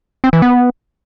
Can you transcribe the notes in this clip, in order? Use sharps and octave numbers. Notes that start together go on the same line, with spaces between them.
C4
E3
B3